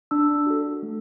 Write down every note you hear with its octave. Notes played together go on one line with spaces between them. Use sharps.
D4 E6
F#4 A4
A3